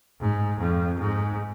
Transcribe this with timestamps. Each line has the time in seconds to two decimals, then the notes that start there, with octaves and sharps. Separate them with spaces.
0.21 G#2
0.60 F2
0.99 G#2